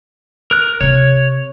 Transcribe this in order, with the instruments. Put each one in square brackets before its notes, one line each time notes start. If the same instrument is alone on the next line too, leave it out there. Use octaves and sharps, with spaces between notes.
[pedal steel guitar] A#4 F#6
[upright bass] C3 C4 [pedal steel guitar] C#5